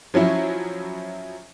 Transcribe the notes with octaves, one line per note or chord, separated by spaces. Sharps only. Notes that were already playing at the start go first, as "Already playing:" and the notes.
F3 F#3 C#4 E4